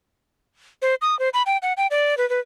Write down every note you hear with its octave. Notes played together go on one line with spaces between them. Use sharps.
C5
D#6
C5
B5
G5
F#5
G5
D5
B4
B4